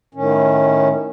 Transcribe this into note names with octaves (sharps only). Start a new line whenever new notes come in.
A2 D#3 C#4